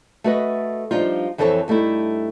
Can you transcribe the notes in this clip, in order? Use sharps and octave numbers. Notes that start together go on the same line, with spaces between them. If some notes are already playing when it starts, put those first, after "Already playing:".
A3 F#4 B4 D#5
F3 G3 D4 D#4 F4
F2 E3 C4 A4 C#5 A5
G2 A3 D#4 E4